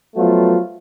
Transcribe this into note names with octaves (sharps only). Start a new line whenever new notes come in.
F3 F#3 A3 B3 F4